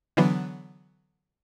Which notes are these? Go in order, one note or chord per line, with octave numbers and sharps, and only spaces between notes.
D3 E3 F#3 B3 D4